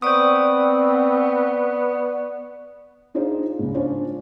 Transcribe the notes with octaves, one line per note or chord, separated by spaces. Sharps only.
B3 C4 C5 D5 C#6 D#6
D4 D#4 F4 G#4 C5
C#2 G#2
C#4 D4 F4 C5 C#5